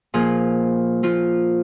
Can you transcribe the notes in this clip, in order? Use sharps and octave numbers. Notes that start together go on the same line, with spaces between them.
A#2 F3 G#4
A#2 F3 F4